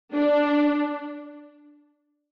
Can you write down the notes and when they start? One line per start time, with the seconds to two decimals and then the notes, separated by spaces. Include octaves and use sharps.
0.14 D4